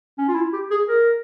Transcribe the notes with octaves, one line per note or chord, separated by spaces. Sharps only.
C#4
F4
E4
G4
G#4
A#4